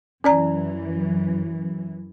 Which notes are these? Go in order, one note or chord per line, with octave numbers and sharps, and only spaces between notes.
F#2 E3 C#4 D5 A#5